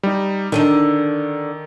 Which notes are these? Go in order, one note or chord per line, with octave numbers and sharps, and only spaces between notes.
G3 D#4
D3 D#3 D4 D#4